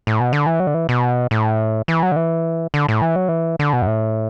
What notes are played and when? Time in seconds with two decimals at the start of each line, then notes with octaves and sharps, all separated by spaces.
0.07 A2
0.20 B2
0.33 D3
0.46 E3
0.60 F#3
0.67 D3
0.74 E3
0.89 B2
1.31 A2
1.88 E3
2.03 F#3
2.12 D3
2.16 E3
2.74 D3
2.88 A2
3.02 E3
3.16 F#3
3.28 E3
3.59 D3
3.73 B2
3.82 F#2
3.87 A2